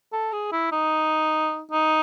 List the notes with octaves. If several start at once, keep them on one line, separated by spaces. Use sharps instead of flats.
A4
G#4
E4
D#4
D#4